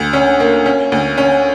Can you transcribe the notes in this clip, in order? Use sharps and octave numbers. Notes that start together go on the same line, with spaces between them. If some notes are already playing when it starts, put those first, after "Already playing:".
Already playing: D2
C#4
A#3
C#4
D2
C#4